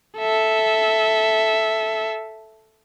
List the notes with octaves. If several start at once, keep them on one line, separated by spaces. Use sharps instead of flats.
A4 E5